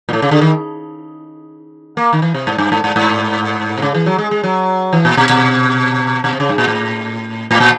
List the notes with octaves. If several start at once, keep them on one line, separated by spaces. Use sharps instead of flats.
A#2
A2
C#3
D3
D#3
A#3
D#3
E3
C3
G#2
G2
G#2
G#2
G#2
C3
C#3
E3
F#3
G#3
G#3
F#3
E3
A#2
B2
B2
B2
C3
C#3
G2
A#2
A2
A2
A#2